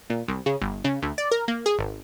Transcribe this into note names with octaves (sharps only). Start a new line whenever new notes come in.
A#2
C2
C#3
G1
C#3
D2
D5
A#4
A#3
G#4
G#1